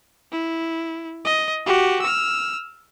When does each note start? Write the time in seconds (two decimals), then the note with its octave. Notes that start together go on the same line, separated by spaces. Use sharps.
0.32 E4
1.25 D#5
1.66 F#4 G4
2.01 E6 F6